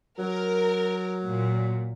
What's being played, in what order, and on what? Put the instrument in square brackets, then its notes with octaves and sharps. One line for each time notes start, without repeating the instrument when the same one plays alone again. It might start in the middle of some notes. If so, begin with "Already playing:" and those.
[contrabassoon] F#3 [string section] A#4
[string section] A#2